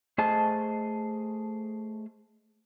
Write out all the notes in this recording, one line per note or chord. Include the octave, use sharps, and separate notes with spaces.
A3 G#4 C5 D#5 A5